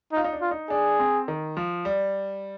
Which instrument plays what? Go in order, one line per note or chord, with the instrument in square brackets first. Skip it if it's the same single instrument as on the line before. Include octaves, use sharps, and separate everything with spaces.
[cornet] D#4
[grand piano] F4
D#4
D4
[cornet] F4
[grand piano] D#4
[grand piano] D4 [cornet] G#4
[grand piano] C4
D#3
F3
G3